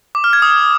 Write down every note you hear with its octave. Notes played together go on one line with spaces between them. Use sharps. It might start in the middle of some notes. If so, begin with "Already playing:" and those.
D6
F6
G#6
D#6